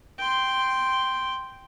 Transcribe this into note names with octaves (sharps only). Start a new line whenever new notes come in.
G5 C6